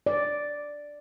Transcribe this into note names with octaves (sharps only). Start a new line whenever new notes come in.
D5